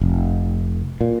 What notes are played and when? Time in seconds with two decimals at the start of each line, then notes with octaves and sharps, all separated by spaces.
0.01 F1
1.01 A#2